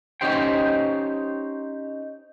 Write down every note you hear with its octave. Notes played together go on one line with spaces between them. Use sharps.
C#4 D#4 G4 C5 G5